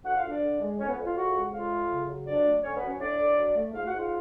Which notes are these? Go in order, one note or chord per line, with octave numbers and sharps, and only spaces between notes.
D2 F#4 F#5
F4 F5
D2
D4 D5
D3
G#3
F2 C#4 C#5
B3 B4
F2
F4 F5
C#3 F#4 F#5
G#3
F2 F4 F5
A3
C#3
F#3
F2 D4 D5
A3
D3 C#4 C#5
B3 B4
F#3
C#4 C#5
A2 D4 D5
A2
F#3
A3
G#2 F4 F5
F#4 F#5
G#2
F4 F5